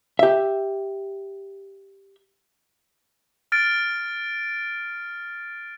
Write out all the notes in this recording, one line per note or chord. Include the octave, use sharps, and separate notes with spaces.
G4 E5
F6 A6 D7